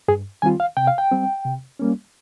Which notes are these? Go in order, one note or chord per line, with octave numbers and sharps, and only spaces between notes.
G2 G#4
D#3 G3 C4 F4 G#5
F5
C3 G5
F5
G5
G3 C4
C3
G3 A#3 C#4